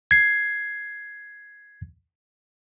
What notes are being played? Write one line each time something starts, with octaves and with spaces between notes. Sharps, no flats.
G#6 C7